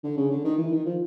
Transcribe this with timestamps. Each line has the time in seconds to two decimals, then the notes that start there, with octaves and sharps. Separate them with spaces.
0.04 D3
0.17 C#3
0.31 D3
0.44 D#3
0.58 E3
0.72 D#3
0.86 F3